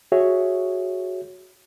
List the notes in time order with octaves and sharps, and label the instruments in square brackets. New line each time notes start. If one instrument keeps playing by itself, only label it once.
[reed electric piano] F#4 G#4 C#5 E5